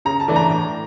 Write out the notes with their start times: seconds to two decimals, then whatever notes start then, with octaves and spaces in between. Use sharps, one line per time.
0.05 C#3 A#5
0.20 A5
0.28 E3 A3 D4
0.36 A#5
0.49 A2